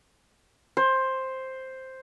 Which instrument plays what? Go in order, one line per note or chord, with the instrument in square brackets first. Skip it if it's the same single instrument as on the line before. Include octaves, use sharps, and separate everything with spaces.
[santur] C5